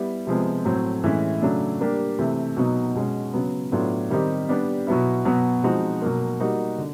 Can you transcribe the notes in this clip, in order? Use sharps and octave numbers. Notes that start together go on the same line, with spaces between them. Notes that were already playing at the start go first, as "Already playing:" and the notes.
Already playing: G3 B3 E4
C3 F3 G#3 B3
A2 F#3 A3 C4
A2 E3 G#3 C#4 E4
C#3 F#3 A3 D4
G3 A#3 D4 G4
C3 E3 A3
B2 F#3 B3 D#4
B2 G#3 C#4
C#3 F#3 B3
A2 F#3 B3 D4 F4
D#3 G3 C4 D#4 G4
G3 B3 D4 G4
B2 F#3 B3 E4
B2 F#3 B3
F3 G#3 C4 D#4 F#4
B2 F#3 A#3
G3 A#3 D#4 F#4
D3